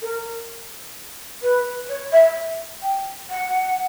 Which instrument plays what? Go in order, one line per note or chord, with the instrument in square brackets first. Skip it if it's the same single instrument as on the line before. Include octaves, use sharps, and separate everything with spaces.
[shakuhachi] A#4
B4
C#5
E5
G5
F#5